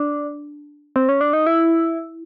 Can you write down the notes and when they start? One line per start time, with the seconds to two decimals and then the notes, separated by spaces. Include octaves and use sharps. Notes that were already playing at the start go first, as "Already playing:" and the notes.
Already playing: D4
0.96 C4
1.09 C#4
1.21 D4
1.33 D#4
1.47 E4